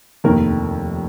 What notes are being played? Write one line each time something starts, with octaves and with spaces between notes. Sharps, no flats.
F1 D#2 D#3 A#4